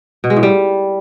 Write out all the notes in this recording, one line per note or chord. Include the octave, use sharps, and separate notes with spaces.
B2
G#3
A2
G3